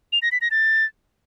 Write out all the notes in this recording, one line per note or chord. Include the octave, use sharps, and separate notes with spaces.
F7
A#6
B6
A#6
A6